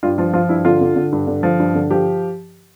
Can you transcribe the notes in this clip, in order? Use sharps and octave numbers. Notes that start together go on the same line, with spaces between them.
G2 F4
F3 F4
F3 F4
G2 E4
D3 F4
D3
D3
G2
D3
F3
G2
D3
F3 G4